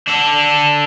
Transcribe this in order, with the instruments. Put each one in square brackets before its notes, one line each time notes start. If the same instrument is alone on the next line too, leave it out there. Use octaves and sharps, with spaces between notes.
[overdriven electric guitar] D4 A4